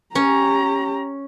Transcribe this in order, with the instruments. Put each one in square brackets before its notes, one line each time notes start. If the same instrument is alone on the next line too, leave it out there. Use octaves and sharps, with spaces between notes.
[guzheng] C#4 [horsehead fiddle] G4 A#5